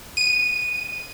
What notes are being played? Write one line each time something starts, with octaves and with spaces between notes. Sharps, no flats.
D#7